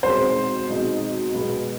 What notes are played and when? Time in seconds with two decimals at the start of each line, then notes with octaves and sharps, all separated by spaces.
0.03 B2 G#3 C4 D#4 C5
0.69 B2 G#3 C4 D#4
1.34 B2 G#3 B3